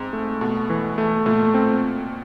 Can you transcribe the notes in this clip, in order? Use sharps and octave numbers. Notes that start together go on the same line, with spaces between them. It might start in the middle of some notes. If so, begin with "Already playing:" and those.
Already playing: G#2 C4
A3
B2 A3
E3
A3
A#2 A3
C4